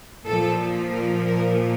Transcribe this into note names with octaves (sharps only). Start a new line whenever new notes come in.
A#2 F3 A4
A#4
A#4